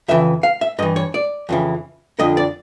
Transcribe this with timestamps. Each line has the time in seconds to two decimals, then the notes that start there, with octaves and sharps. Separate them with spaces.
0.08 F2 C#3 E3 E5
0.43 F5
0.61 E5
0.79 G2 D#5
0.82 E3
0.96 C#5
1.14 D5
1.49 F2 C#3 E3
2.19 F2 D3 D#5
2.37 D5